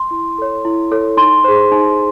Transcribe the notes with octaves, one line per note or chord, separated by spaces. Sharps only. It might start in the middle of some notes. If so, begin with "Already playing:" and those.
Already playing: C6
E4
A4 C#5
E4
A4 C#5
D#4 C6
G#4 C5
D#4